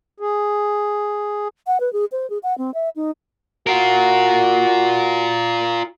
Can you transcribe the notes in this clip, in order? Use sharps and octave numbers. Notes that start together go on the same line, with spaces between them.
G#4
F#5
B4
G#4
C5
G#4
F#5
C4
E5
D#4
F4 F#4 A#4